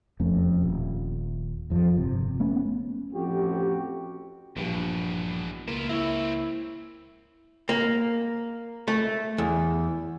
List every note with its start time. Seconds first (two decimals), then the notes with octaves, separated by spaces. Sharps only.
0.20 E1 F2 A3 C#4
0.64 D#1
1.70 G#1 F2 D#3 F3
1.94 G1 C3
2.40 A3 B3 C#4
3.13 A1 F2 F#4 G4
4.57 A#1 E2 G2 B2
5.68 C#2 A#3 E4 F4
5.89 C4 E4 C#5
7.69 A#3
8.88 A3
9.38 E2